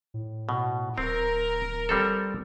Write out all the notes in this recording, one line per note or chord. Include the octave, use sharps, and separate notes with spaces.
A2
B2
D1 C4 A#4
G3 C4 A4